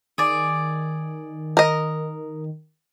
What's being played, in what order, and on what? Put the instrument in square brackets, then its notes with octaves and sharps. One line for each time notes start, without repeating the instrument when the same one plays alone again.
[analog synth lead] D#3 [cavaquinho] G#4 D5
[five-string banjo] A#4 D#5